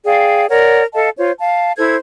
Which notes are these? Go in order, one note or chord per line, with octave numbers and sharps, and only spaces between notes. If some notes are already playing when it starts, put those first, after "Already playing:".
G#4 D5 F5 G5
A#4 C#5 D5 F#5
A4 D#5 F5 A5
F4 C5 C#5
F5 A5
E4 A4 C5 G#6